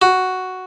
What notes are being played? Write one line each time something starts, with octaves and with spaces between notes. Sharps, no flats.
F#4